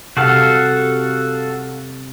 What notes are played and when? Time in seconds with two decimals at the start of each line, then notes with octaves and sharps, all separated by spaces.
0.17 C3 F#4 A4 F5